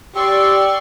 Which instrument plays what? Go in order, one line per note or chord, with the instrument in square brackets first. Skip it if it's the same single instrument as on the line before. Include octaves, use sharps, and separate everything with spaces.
[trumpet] G4 [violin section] D5 C6 C#6 [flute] E6